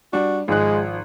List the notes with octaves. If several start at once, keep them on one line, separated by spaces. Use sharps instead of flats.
G3 D4 F#4
G#1 F3 G#3 F#6